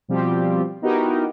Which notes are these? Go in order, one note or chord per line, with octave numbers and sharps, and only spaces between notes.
B2 F3 G3 C4 F4 G4
B3 D#4 E4 F#4 G4 A#4